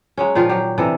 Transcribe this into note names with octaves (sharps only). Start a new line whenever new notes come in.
F#3 G#3 C#4
A#2 D#3 F3 F4
F#3 G4
C3 E3 D4 A4